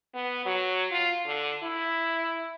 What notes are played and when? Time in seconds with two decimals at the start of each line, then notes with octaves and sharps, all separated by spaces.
0.14 B3
0.45 F#3
0.91 F4
1.26 D3
1.63 E4